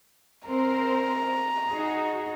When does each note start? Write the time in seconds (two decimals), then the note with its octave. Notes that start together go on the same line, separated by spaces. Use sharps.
0.47 C4 A#4 C5 A#5
1.72 D#4 F#4 G#4